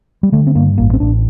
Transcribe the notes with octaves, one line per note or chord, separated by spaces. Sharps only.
G3
D3 A3
C4
G2 A#3
A1 A#3
C4
A1 D4